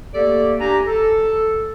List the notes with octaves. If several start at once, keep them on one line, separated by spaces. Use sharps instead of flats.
A3 A#3 G4 A4 D5
D4 G4 G#5 A#5
A4